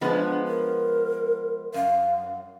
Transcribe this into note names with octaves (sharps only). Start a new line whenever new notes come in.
F3 G#3 B3 D4
A#4
F#2 F5